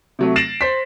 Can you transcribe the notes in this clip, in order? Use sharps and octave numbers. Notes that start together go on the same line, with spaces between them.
C3 F#3 A3
A6 A#6 C7 D7 E7 F#7
C5 B6